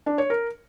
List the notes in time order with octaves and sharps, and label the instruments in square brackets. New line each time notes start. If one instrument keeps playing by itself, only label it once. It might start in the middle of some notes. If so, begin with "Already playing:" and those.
[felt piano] D4
C#5
A#4